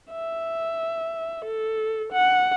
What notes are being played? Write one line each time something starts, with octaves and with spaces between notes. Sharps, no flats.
E5
A4
F#5